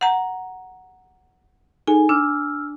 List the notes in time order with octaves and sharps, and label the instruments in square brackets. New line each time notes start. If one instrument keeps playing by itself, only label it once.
[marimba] F#5 A#5
[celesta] D#4 G#4 A4 [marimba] G#5
[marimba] D4 [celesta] E6 F6